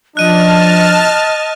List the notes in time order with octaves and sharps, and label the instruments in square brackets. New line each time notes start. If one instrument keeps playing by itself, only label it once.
[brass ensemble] F3 D4 [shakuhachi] D#5 [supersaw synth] A5 F6 [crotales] F#6 D#7